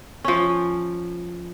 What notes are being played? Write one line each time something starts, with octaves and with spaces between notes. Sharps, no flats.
F3 C#4